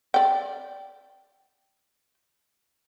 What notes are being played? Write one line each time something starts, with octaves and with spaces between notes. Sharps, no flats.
D5 G5